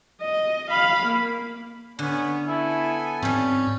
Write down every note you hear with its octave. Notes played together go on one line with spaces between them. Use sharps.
D#5
F5 B5
A#3
D3 B3 C#4
B3 E4 A4 G#5
G#2 F3 G3 C4 C#4